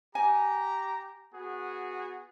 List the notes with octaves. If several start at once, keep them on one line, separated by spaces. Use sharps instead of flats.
G4 G#5 A#5
B3 F#4 G#4